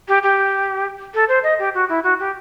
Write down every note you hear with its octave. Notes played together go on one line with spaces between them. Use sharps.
G4
G4
A4
C5
D#5
G4
F#4
E4
F#4
G4